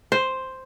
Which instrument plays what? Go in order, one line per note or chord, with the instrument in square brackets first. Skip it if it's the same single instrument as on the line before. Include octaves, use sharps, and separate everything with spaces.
[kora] C5